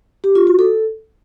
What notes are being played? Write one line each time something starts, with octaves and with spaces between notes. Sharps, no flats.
G4
F4
F#4
A4